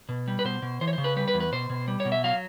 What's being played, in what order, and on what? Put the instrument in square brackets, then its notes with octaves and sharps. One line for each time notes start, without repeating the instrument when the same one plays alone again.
[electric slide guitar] B2
G3
B4
B2 C5
B2
E3 C5
C#5
C5
C#3
B4
G3 B4
B4
E2
B4
B2 C5
B2
G3
C#5
B2
E5
F#3 F5